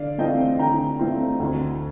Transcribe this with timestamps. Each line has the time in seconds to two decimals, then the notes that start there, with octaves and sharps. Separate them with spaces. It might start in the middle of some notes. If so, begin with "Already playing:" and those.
Already playing: D3 D5 F5
0.18 A3 C4 F4 D#5 G5
0.59 D3 G5 A#5
0.99 A3 C4 F4
1.40 D2